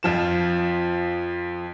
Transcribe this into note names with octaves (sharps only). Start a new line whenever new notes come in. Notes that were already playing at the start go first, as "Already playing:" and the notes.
F2 F3 E7